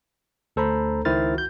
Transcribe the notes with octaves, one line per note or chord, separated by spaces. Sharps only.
D2 A4 C5 A#5 B5
C#2 D#3 E4 C5 F6 A6
F#4 G6